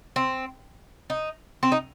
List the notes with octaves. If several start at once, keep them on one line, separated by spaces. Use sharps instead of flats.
C4
D#4
C4
D#4